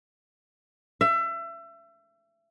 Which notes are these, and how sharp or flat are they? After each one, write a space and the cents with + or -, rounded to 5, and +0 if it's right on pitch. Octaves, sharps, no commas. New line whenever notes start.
E5 +30